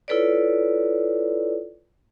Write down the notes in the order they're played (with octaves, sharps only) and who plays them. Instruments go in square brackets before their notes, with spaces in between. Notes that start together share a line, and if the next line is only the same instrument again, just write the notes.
[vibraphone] E4 F4 A4 B4 C#5 D5